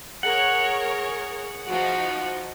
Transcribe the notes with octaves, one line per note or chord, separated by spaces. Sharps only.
G#4 A#4 C#5 F#5
F3 D#4 F#4